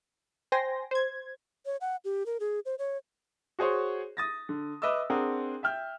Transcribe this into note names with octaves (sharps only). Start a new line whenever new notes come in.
C5 G5 G#5 C6 A#6
C5 G#6
C#5
F#5
G4
A#4
G#4
C5
C#5
F#4 G#4 C5 C#5
D#6 A6 A#6
D3
B4 D#5 E5 D6 E6
C4 D4 G#4 A#4 F#5
E5 G5 F6 G6